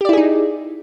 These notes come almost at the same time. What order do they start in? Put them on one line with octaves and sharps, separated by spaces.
G4 D5 E4 G#4 D#4